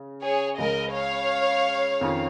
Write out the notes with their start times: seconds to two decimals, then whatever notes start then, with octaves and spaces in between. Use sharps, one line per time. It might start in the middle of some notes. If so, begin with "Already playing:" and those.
Already playing: C#3
0.23 G#4 C#5
0.58 C#2 C#3 G#3 A#4 D#5
0.94 C#5 F5
2.01 F2 D#3 C#4 F4